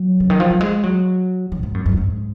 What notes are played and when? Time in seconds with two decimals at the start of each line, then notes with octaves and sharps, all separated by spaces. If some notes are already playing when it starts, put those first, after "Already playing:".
Already playing: F#3
0.20 C#3
0.30 D#3
0.40 F3
0.51 F#3
0.61 G#3
0.83 F#3
1.52 F3
1.59 A#2
1.63 G#2
1.74 F#2
1.86 F#2
1.97 G#2